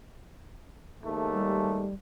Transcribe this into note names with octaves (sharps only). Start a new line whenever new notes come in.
D#2 G#3 A3
G3